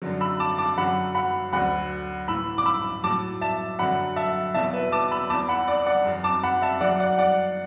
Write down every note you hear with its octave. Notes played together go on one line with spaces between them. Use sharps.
F#2 D3 F#3
B5 E6
A5 D6
A5 D6
F#2 D3 F#3 F#5 B5
F#5 B5
D2 D3 F#3 F#5 B5
A2 E3 B5 E6
D6
B5 E6
A2 F#3 A5 D6
E5 A5
F#2 D3 F#3 F#5 B5
E5 A5
E2 B2 F#3 E5 A5
B4 E5
A5 D6
B5 E6
E2 E3 A5 D6
F#5 B5
D5
D5 F#5
F#2 F#3
A5 D6
F#5 B5
E5 A5
F#2 F#3 D5 F#5
D5 F#5
D5 F#5